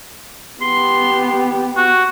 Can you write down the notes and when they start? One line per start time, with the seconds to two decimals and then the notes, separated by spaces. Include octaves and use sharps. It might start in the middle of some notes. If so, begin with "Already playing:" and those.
0.62 B3 G4 C6
1.77 F#4